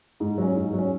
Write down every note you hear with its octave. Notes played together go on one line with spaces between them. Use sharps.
G#2
F#3 C#4
G#2
F#3 C#4